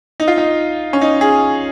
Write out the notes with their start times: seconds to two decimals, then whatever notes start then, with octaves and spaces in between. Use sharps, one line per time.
0.20 D#4
0.28 F4
0.38 D#4
0.93 C#4
1.01 D#4
1.21 G#4